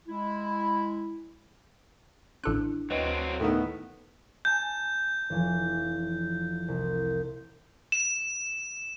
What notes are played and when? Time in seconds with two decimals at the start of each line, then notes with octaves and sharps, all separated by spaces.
0.08 G#3 E4
2.44 A1 D4 E4 A4 F#6
2.90 D2 F#3 C4 B4 D#5
3.40 A2 D#3 B3
4.45 G#5 A5 G6
5.30 F1 E3 F3
6.68 C2
7.92 E7